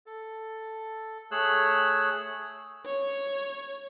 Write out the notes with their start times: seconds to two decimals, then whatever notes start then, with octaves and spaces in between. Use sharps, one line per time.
0.06 A4
1.31 A3 G#4 C#5 E6 F#6
2.85 C#5